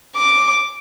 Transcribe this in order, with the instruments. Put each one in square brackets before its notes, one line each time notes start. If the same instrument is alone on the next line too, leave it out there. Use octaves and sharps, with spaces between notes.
[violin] D6